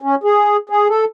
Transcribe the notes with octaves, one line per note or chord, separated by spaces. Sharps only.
C#4
G#4
G#4
A4